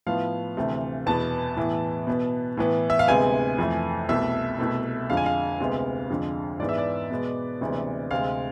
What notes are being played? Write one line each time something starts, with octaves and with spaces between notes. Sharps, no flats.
A2 F3 B3 F5
D2 C3 E3 A3
E2 B2 B3 A5
A2 E3 B3
B2 B3
A2 E3 B3
E5
F5
D2 C3 G#3 B3 G#5
F2 E3 A3
C2 B2 A3 E5
C2 B2 A3
F2 D3 G#3 F5
G#5
F5
D2 C3 G#3 B3
F2 D3 G#3
G#2 E3 B3 D5
E5
D5
B2 G#3 B3
D2 C3 E3 G#3 B3
D2 C3 G#3 F5